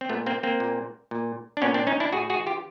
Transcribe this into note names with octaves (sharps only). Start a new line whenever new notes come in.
C4
A#2 A3 B3
A#3 C4
A#3 C4
A#2
A#2
D4
A#2 B3 C#4
C4 D4
C#4 D#4
D4 E4
A2 F#4 G#4
F#4 G#4
E3
F4 G4